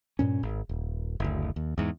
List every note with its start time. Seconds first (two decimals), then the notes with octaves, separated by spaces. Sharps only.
0.19 G2 A#2 C#4
0.43 G#1
0.69 D#1
1.20 F#1 D2
1.56 D#2
1.78 E2 G#2